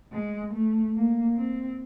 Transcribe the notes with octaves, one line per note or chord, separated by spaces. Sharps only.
G#3
A3
A#3
C4